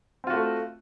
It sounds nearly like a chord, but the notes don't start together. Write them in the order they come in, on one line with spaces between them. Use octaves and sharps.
C4 F4 F#4 A3